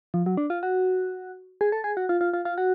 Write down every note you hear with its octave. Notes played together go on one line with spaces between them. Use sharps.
F3
F#3
D4
F4
F#4
G#4
A4
G#4
F#4
F4
F4
F4
F4
F#4